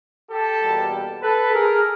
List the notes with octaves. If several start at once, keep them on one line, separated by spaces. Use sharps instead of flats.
G4 A4
E2 B2 G3 A#3
A4 B4
G#4 A#4